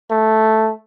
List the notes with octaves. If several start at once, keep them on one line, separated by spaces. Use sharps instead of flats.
A3